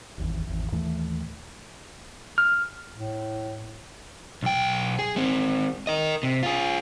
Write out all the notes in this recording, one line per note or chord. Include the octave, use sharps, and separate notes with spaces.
D#1 G#1 E2
G#1 E2
D#2 A2 E3 A3
F6
A2
B1 G5
G#4
G#3 C4
A#4 D#5
C3
F4 G#4